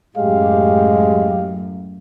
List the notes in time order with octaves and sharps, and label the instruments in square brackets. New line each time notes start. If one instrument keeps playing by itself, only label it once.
[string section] F#2 A2 [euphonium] G#3 [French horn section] G4 [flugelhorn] F5